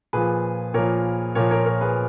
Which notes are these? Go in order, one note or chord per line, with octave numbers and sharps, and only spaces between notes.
A#2 F3 G#4 B4
A#2 F3 A#4 C#5
A#2 F3 A#4 C#5
A#4 C#5
A#4 C#5
G#4 B4